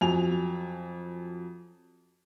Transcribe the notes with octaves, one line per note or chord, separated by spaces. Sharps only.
F2 F#3 G#5 F7